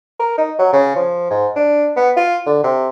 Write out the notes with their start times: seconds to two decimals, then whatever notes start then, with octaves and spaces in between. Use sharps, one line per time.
0.19 A#4
0.38 D#4
0.59 F#3
0.73 C#3
0.96 F3
1.30 G#2
1.56 D4
1.96 B3
2.16 F4
2.46 D3
2.63 C3